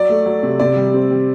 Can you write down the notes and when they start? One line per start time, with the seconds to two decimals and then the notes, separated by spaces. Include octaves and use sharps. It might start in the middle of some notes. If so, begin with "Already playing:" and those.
Already playing: F#3 D5
0.09 A3
0.26 F#3
0.43 C3
0.60 C3 D5
0.76 G3
0.94 C4
1.11 G3